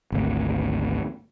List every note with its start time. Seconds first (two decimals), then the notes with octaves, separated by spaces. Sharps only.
0.12 G#1 D2